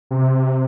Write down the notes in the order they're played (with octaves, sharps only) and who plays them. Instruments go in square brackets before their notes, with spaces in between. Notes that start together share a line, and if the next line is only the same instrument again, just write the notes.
[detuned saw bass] C3